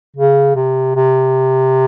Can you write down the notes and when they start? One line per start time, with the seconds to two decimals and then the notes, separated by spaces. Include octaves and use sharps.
0.16 C#3
0.56 C3
0.95 C3